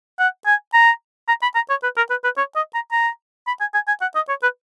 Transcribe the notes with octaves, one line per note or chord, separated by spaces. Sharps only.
F#5
G#5
A#5
A#5
B5
A#5
C#5
B4
A#4
B4
B4
C#5
D#5
A#5
A#5
B5
G#5
G#5
G#5
F#5
D#5
C#5
B4